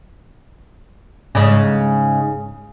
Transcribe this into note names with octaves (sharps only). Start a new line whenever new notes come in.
G#2 C#3